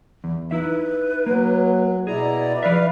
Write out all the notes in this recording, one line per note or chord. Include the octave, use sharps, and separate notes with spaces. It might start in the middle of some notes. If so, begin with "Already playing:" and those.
E2
D#4 E4 B4 E5
F#3 A#3
B2 E4 G#4 D5 A#5
F3 B4 E5 F5